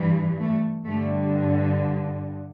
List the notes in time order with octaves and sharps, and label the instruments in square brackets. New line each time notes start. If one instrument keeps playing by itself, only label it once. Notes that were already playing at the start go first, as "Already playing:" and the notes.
Already playing: [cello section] G2 E3 G3
A3
G2 D3 G3 A3